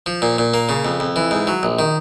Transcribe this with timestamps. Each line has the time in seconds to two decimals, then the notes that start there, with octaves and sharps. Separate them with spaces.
0.06 F3
0.22 A#2
0.38 A#2
0.54 A#3
0.69 C#3
0.85 F2
1.00 F2
1.16 E3
1.31 G#2
1.47 F#3
1.63 A#1
1.79 D#3